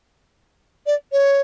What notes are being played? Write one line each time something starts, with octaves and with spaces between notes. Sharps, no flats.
D5
C#5